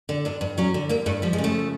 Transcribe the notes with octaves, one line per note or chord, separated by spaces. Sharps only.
D3
G2 D4
G2
F#3 C#4
D3
G2 A#3
G2 A3
F3 G3
G#3
C#3
A3